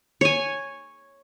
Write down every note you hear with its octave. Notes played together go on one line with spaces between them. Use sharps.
C#5 G#5